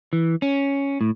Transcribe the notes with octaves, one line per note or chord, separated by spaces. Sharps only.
E3
C#4
A2